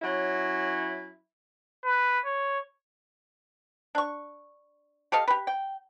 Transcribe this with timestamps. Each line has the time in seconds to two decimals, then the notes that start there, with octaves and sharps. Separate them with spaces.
0.02 F#3 C#4 E4
1.85 B4
2.25 C#5
3.95 D4 C#6
5.12 G4 A4 D#5 F5
5.28 G4 B4
5.47 G5